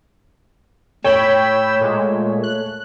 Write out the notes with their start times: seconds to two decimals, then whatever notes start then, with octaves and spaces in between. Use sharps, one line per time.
1.04 A2 C#5 G5 B5 E6 G6
1.81 A#2 G#3 A3
2.43 F#6